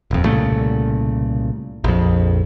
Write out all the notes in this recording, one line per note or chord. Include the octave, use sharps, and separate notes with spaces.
D#1 F2
C2 A#2 C#3 A3
A#1 F2